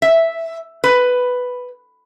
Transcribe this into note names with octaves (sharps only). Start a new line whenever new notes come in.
E5
B4